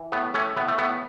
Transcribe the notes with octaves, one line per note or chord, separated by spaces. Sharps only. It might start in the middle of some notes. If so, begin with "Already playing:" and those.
Already playing: E3
A2 B3
A2 A3 C#4
A2 B3
A3
A2 B3